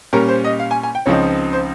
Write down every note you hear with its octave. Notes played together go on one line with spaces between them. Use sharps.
A#2 G3 C#4 A#4
C5
D#5
F5
G#5
G#5
G5
C#2 C#3 F3 C4 D#4 C#5
C5